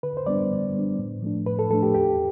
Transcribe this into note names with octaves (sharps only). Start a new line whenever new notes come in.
D3 B4
C5
G3 B3 D4 D5
D3
G3 B3 D4
A2
F3 A3 D4
A2 B4
A4
F3 A3 D4 A4
G4
E2 G4